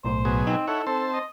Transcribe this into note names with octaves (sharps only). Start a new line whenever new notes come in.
B1 A2 C5
B2 F#3 G#4
C4 D#4
E4 A4 C#5 F#5
C4 A4 C5 A5
D#5